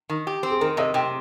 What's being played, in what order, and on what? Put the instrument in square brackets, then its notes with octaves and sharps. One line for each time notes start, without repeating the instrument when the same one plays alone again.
[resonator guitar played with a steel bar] D#3
G4
C4
[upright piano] G#4
[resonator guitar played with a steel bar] D#3 [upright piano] A#4
[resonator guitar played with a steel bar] C3 [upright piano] D#5
[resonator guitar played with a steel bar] C3 [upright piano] G5